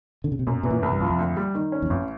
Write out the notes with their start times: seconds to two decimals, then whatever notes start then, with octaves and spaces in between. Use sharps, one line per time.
0.24 D3
0.32 C#3
0.39 C3
0.47 F#2 B2
0.63 B2 E3
0.70 A#2
0.83 C2 A2
0.92 G2
1.00 F#2 F3
1.10 F2
1.19 D2
1.37 G3
1.55 D#3
1.72 C#4
1.82 E2
1.90 A1 F2